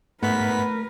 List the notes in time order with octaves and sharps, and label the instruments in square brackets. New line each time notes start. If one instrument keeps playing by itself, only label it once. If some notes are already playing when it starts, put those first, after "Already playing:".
[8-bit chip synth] G#2 B6 [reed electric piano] A3 [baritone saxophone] B3 [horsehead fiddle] A#4 B4